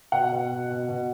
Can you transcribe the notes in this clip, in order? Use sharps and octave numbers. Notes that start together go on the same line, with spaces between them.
B2 F#5
B2
B2
B2
B2